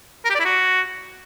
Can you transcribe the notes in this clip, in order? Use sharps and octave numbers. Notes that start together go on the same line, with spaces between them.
A#4
G4
D5
E4
F#4